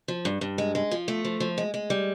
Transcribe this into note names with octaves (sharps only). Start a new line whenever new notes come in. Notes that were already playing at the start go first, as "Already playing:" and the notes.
F3
G2
G2
G#3
G#3
F3
A3
F3
F3
G#3
G#3
G3